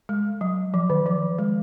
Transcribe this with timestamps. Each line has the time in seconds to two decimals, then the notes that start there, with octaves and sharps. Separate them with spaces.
0.09 G#3
0.41 F#3
0.74 F3
0.90 D#3
1.06 F3
1.39 G#3